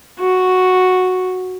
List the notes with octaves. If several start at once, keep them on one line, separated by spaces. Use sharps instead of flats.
F#4